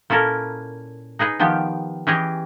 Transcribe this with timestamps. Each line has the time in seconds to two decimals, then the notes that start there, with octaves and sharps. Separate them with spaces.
0.10 A#2 C#4 E4 A4 A#4
1.19 D#4 G#4 B4 D#5
1.40 D#3 F3 B3 G4
2.07 E3 C#4 G4 G#4 C#5 D#5